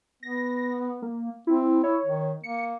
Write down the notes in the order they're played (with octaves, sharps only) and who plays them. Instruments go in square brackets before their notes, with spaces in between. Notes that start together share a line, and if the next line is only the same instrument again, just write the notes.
[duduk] B3 [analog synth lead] A#6
[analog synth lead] A#3
[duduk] C4 [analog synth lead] E4
[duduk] E4 [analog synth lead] C#5
[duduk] D#3
[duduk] A#3 [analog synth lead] C#7